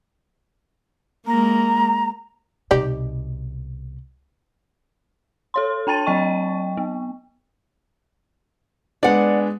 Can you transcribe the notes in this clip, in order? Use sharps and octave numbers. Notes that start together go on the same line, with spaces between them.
G#3 A#3 A#5
C2 B2 D#4 G4 D5
A4 C#5 C6
D4 G5 A5 A6 D#7
F#3 C4 D#5 G5 C#6
B3
G#3 B3 D4 D5 F#5